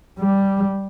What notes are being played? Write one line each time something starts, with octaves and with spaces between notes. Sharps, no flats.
G3